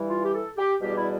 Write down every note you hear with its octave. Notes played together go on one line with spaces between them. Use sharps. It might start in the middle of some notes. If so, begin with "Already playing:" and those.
Already playing: G2 E3 G3
F4
G4
A4
G4
E2 B2 G3 G4
E4